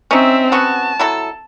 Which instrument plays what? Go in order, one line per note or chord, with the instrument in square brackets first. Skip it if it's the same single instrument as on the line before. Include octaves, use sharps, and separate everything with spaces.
[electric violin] C4 E5 [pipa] C#4 D#4
[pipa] B3 C#4 F#4 [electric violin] A5
[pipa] F#3 E4 A4